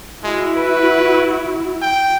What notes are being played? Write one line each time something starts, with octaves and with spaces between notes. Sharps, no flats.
G#3 E4 F#4
B4
G5